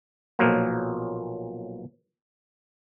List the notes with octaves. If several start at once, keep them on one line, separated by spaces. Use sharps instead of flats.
B1 A#2 F3 F#3 A#3